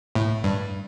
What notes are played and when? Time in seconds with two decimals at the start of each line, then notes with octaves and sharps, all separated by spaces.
0.15 A2
0.44 G2